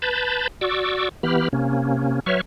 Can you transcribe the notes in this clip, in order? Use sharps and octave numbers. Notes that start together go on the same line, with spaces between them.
B4 A5 B5 G6 A6
F#4 D5 C#6 D6 E6
E3 B3 G4 B5 F6
C3 A#3 C#4
F#3 B4 C#5 E5 C#6 F6